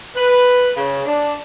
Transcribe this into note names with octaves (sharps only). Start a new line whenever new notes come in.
B4
C#3
D4